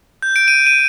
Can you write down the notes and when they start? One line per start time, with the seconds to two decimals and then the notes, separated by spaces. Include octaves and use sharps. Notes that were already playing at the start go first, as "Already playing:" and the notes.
0.22 G6
0.36 D7
0.48 D#7
0.67 D#7